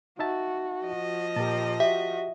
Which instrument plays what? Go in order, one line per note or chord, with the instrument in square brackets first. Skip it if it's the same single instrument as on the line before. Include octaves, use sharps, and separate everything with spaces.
[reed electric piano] D#4 E5 A5 [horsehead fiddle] F#4
[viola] F3 D#5
[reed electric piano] A#2 A5 [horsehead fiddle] G4 A#4
[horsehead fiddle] F#4 [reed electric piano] G4 [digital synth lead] E5